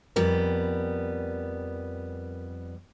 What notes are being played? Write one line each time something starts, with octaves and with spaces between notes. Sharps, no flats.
F2 G3 B3 A#4